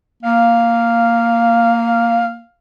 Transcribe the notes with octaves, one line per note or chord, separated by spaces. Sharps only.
A#3 F5